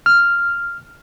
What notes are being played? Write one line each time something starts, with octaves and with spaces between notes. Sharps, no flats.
F6